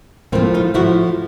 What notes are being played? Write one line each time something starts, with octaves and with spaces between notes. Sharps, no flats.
A2 F3 A#3 C4
D#4 F4
A2 F3 E4 F#4